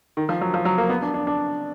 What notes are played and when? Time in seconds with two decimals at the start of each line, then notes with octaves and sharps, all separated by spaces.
0.17 D#3
0.29 F3
0.41 F#3
0.54 F3
0.65 F#3
0.78 A#3
0.89 B3
1.02 D4
1.14 D4
1.27 D4